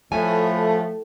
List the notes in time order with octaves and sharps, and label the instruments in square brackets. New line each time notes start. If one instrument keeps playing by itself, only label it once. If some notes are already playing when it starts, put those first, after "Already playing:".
[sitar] A2 [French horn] F3 [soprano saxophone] A3 [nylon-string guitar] G#5